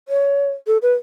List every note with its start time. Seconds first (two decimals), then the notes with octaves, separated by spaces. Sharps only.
0.08 C#5
0.67 A4
0.82 B4